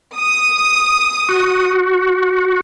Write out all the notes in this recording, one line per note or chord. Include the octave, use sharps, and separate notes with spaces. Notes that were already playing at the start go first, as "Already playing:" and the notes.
D#6
F#4